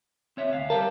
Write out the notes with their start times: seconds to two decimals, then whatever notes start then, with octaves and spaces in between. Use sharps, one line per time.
0.37 C4 C#5 E5
0.52 D2 F5
0.70 G3 G4 A#4 A5